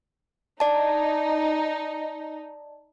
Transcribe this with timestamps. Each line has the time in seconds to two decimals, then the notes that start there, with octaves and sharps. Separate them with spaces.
0.60 D#4 D5 A5